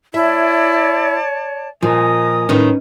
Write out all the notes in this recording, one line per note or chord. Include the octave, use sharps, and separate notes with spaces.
E4 C#5 D5 E5 A5
A#2 F3 A#4 D#5 G#5 D#6
A2 D#3 C#4 D#4 B4